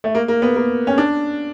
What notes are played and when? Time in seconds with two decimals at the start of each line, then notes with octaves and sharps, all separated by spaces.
0.04 A3
0.15 A#3
0.28 A#3
0.42 B3
0.56 A#3
0.87 C#4
0.98 D4